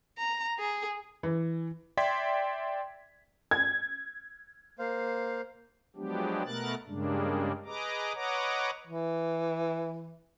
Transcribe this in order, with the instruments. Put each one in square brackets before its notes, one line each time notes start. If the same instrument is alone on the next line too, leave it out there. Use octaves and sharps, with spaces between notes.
[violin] A#5
G#4
[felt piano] E3
[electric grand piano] D5 E5 G5 C6 G#6 B6
[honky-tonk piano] G#6
[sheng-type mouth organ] A#3 C5 F5
[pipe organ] F3 F#3 G#3 B3 D4 G4
B2 A3 B3 A#4 F#6 A6
G2 C#3 G3 G#3 A#3 D4
G#4 B4 D#5 A#5 D6
B4 C#5 D#5 F#5 A#5 D6
[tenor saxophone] E3